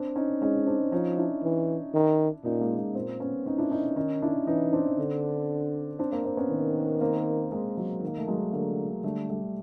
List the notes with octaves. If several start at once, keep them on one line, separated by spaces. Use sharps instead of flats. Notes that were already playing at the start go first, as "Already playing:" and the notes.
Already playing: C4 D4
C#4 D#4
G#3 C#4 D#4
C4 D4
F3 C#4 D#4
D4 E4
E3
D#3
A#2 C#4 D#4
G#3 A#3
G#3 A#3
A#2 A#3 C4
B3 C#4
C#4 D#4
D4 E4
C#4 D#4
D#3 C#4 D#4
D4 E4
E3 C#4 D#4
C4 D4
D3
C4 D4
A#3 C4
A#3 C4
B3 C#4
D#3
A#3 C4
G#3 A#3
F#3 G#3
D#3 A#3
A3
F#3 G#3
D3 G#3 A#3
D3 G3 A3
G3 A3